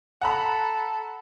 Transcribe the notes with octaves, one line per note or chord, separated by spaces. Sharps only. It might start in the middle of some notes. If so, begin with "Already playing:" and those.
A4 F#5 A#5 B5